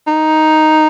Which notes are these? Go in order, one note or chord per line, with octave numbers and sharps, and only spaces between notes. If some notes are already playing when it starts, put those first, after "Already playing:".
D#4